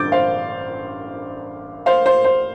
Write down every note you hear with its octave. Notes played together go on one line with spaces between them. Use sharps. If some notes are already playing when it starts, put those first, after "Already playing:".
Already playing: A1 G2 D3 G3 C4 D6 G6 A6
C5 F5
C5 F5
C5
C5